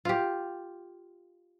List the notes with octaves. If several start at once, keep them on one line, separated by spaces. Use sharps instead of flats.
F4 G4